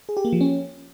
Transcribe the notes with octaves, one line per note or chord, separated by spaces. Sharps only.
G#4
G4
A#3
F3
C#4